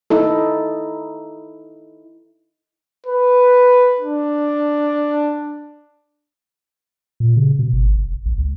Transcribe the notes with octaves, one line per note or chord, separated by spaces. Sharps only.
D#4 E4 A4
B4
D4
A#2
C#3
B2
G1
F1
A#1
C#2